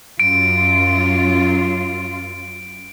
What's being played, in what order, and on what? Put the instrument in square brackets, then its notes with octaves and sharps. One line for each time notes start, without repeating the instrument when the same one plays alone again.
[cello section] F#2 F#3 F4 [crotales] D7